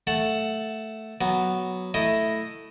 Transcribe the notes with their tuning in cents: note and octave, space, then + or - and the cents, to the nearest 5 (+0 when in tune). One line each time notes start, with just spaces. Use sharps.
A3 +0 F#5 +0 A5 +0
F#3 +0 B3 +0
A3 +0 E4 +0 D#5 +0